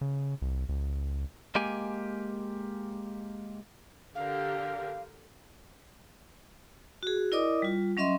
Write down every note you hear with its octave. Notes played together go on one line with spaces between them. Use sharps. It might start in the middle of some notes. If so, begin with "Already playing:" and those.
C#3
C2
C#2
G#3 A#3 G4 G#5
D3 G4 A#4 F5
F#4 G#4
E4 A#4 D5 D#5 D6 D#6
G3 F4
F#3 C#4 D#5 E5 C6